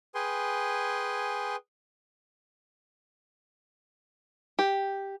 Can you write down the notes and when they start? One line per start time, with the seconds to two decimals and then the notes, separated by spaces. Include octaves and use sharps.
0.15 G#4 B4 G5 G#5 C6
4.59 G4